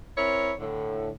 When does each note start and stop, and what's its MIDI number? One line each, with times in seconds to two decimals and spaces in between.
0.17 0.53 60
0.17 0.53 64
0.17 0.53 70
0.17 0.53 73
0.59 1.10 45
0.59 1.10 50